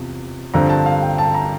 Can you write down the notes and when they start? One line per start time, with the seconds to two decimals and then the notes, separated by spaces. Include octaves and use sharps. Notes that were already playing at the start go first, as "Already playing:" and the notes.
Already playing: E2 C3 F3
0.54 G2 D3 F3 C4 A#5
0.70 A5
0.86 F5
1.02 G5
1.18 A5
1.34 A#5